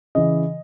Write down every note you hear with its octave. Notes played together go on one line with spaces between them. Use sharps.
C#3 E3 D#5